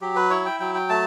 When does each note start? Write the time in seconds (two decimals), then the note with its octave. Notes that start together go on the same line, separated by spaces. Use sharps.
0.01 F#3 G4
0.16 B4
0.30 E4 C#5
0.45 G5
0.60 F#3 G5
0.75 G5
0.89 A3 A5